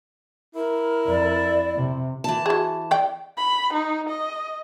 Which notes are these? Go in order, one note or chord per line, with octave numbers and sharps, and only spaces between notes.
E4 A#4
F2 D5
C3
E3 A5
F#4 G#4
D5 G5
B5
D#4
D#5